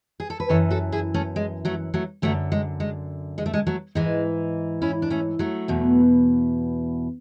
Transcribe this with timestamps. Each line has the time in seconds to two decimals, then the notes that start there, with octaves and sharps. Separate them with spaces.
0.20 G#4
0.30 A4
0.40 B4
0.49 F#2 E3 A4 C#5
0.70 F#4 A4
0.92 E4 G#4
1.14 A3 C#4
1.36 G#3
1.65 F#3 A3
1.94 F#3 A3
2.22 F#2 D3 F#3 A3
2.52 G#3
2.80 G#3
3.38 G#3
3.46 A3
3.53 G#3
3.67 F#3 A3
3.95 G#2 E3 G#3
4.82 C#4 E4
5.02 D4
5.10 A3 C#4
5.39 F#3 A3
5.68 E2 B2